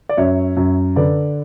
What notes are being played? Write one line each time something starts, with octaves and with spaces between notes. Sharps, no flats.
D5
F#2 C#5 E5
F#2
D3 B4 D5